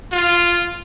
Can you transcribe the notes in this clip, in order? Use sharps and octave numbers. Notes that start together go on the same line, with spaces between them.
F4